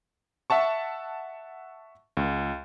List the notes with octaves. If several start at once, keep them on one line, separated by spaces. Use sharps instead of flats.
E5 F#5 A5 C#6
C#2